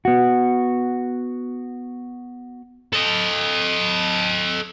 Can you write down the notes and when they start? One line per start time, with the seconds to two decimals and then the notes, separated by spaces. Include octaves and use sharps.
0.05 B3 F#4
2.93 A4 D#5